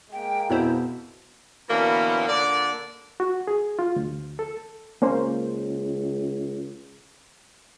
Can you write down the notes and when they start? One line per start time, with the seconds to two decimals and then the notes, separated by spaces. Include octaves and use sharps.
0.12 G#3 A#3 G5
0.50 F2 B2 E4 C5
1.69 B2 D3 E3 A#3 B3 C#4
2.28 A#2 D3 A#3 D5
3.20 F#4
3.47 G#4
3.79 F4
3.96 D2
4.39 A4
5.02 C#2 A#3 C#4 C5